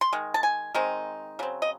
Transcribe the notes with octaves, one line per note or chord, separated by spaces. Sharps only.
C6
D#3 G#3
A5
G#5
D#3 G#3 C4 D#4
C#3 F#3 C4
D#5